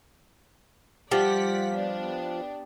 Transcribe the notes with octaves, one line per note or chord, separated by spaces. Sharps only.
F3 G3 G4 D5 F#5 B6
B3 D4